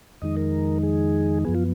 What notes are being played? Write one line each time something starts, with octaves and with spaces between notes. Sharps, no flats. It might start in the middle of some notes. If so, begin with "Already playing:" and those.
F2 D#3 G#3 D#4 D#5
A#4
G#4
F#2 F3 B3 G#4
F4